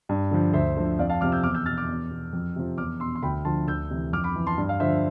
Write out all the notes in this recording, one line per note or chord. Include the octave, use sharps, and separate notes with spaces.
G2
D3 F3
D2 C5 E5
D3 F3
F2 D5 F5
F5 A5
C3 F3 D6 F6
E6 G6
E2 D6 F6
E6 G6
B2 F6 A6
D6 F6
E2
B2
F2
C3 F3
E2 D6 F6
B2 C6 E6
C6
D2 G5 B5
D3 F3 A5 C6
D2 E6 G6
C3 E3
F2 D6 F6
B5 D6
E3
A5 C6
G2
F5
D3 F3 C5 E5